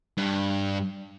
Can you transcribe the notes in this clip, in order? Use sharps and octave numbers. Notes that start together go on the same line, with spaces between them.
G2